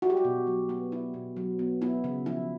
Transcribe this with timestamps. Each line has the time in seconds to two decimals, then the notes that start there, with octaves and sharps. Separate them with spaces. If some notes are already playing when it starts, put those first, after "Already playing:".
0.02 E4 F#4
0.10 G4
0.17 F#4
0.25 B2
0.47 F#3
0.69 B3
0.92 E4
1.14 B2
1.37 F#3
1.59 B3
1.82 B3 E4
2.04 C#3
2.26 F3 E4